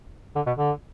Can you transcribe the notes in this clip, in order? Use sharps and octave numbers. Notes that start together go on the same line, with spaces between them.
D3
B2
D3